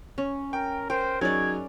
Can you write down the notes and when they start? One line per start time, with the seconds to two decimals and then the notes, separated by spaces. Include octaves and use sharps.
0.18 C#4
0.53 A#4 G5
0.90 A#4 C5 G5
1.21 F#3 C#4 D#4 G#4 D5 G#6